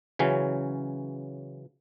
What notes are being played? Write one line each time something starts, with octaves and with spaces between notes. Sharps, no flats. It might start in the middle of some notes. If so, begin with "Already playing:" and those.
C#3 E3 F#3 C#4